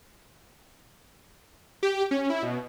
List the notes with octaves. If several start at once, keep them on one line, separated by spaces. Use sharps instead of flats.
G4
C#4
E4
B2